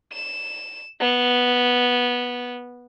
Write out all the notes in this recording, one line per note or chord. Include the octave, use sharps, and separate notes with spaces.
E7
B3